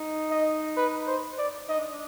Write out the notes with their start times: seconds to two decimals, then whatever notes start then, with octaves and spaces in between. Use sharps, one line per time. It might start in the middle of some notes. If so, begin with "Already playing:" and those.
Already playing: D#4
0.31 D#5
0.77 B4
1.08 C5
1.39 D5
1.69 D#4 D#5
1.77 D4
1.93 D4